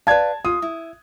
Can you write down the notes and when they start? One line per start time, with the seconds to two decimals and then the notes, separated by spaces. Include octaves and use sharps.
0.07 B4 D5 F5 A5 G#6
0.45 F4 D#6
0.62 E4